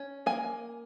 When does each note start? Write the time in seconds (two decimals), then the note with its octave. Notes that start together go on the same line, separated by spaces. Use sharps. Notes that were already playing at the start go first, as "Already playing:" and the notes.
Already playing: C#4
0.26 A#3 G#5